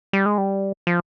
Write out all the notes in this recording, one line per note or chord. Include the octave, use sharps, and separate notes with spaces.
G3
G#3
G3
F3